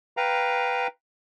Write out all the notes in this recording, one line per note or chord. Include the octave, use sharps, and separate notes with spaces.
B4 F5 G5 A#5